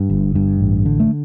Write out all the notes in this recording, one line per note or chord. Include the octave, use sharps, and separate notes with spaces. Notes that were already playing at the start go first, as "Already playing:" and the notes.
Already playing: G2
G1
G2
A1
D3
A3